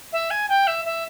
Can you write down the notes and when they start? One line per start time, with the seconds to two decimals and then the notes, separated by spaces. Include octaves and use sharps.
0.13 E5
0.31 G#5
0.49 G5
0.67 E5
0.85 E5